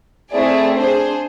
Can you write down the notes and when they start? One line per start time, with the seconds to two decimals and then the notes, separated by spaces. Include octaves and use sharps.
0.32 A3 C4 E4 G#4 D5
0.76 D4 G#4 C5